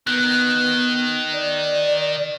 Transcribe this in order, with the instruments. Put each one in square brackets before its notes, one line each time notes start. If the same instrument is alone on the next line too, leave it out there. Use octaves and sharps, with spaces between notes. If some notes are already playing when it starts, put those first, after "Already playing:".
[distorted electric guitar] D#3 [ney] B3 [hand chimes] F#6
[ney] D5